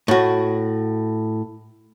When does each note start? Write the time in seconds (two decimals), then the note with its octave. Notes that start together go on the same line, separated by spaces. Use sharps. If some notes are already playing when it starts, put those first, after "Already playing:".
0.08 A2 F#4